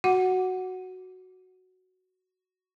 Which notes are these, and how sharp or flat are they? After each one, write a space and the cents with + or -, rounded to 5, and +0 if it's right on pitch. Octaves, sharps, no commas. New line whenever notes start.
F#4 +0 F#5 +0